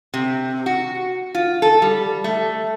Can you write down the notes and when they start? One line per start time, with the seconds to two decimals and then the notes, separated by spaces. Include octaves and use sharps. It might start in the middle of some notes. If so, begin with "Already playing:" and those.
0.14 C3
0.66 F#4
1.35 F4
1.62 A4
1.82 G3
2.24 A3